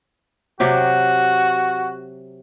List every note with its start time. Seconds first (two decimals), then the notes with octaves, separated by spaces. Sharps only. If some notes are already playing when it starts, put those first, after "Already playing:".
0.60 C3 F#3 F#4 G4